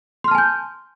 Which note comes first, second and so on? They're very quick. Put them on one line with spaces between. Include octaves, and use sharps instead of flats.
C6 F6 A5 G#5 G6